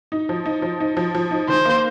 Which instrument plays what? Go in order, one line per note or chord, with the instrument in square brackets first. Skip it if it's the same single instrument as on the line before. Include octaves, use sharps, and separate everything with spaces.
[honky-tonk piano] D#4
F3
D#4
F3
D#4
F3
F3
D#4
[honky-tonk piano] D#3 [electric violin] C5
[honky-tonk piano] A#3